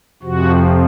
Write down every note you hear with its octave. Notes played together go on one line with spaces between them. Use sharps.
F2 C3 F3 F#4